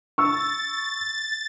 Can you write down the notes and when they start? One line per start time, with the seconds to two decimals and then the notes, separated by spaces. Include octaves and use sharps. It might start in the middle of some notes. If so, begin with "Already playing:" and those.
0.18 C#6 E6 A6